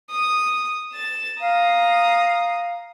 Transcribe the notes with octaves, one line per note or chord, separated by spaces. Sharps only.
D#6
A6 E7
F5 A#5 D#6